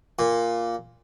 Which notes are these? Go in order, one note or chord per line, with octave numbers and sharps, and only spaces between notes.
A#2